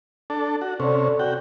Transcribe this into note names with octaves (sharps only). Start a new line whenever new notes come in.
D4 A4
F#4
C3 C#4 A4 D5
F#4 G5